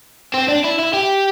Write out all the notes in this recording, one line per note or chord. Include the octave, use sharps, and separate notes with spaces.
C4
D4
E4
E4
G4